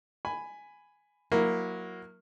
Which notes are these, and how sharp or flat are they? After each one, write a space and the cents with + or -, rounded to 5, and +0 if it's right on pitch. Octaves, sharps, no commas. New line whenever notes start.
G#5 +0 B5 +10
F#3 -15 A#3 +0 E4 +0